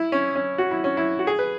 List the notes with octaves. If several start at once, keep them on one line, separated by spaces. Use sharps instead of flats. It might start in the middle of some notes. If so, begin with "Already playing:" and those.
Already playing: E4
C#4
C#4
F#4
E4
C#4
E4
F#4
G#4
B4